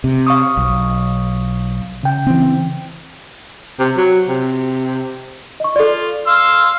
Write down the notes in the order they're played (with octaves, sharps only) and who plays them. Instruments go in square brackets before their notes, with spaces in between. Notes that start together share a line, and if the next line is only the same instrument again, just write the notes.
[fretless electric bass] C3
[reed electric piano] F5 C#6 D#6
[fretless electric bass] B1
[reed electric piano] C#3 G5
[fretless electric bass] E3 C4
[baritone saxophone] C3
F#3
C3
[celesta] D#5 C#6
[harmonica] F4 [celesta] A4 D5
[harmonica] F5 C6 E6